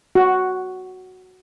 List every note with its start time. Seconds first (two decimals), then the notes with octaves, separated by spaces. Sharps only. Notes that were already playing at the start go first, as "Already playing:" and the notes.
0.15 F#4